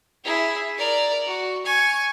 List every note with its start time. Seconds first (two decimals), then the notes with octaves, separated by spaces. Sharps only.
0.24 E4 G#4
0.77 A#4 D5
1.27 F#4
1.65 G#5 C#6